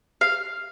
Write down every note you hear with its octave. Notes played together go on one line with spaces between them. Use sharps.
F5